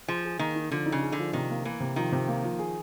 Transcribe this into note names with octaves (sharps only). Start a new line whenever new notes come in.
F3 G#4
G#4
D#3 A#3
D#4
D3 F3
D#4
C#3
G#4
D3
F3
C3 D#3
A#3
E3 A#3
C3
D#3 F3
C3
A#3
F3
G#4